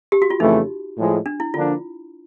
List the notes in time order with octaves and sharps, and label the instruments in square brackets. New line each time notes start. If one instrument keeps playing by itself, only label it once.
[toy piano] G4
F#4
F4
[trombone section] F2 C#3 E3 A3 [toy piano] D#4
[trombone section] A2 F3 G#3
[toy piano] D4
E4
[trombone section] D3 F3 A#3 D4 [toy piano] F4